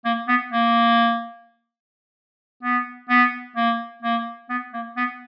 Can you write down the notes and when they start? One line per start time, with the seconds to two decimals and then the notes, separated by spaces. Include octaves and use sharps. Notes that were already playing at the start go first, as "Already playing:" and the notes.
0.05 A#3
0.28 B3
0.52 A#3
2.63 B3
3.09 B3
3.56 A#3
4.03 A#3
4.49 B3
4.73 A#3
4.97 B3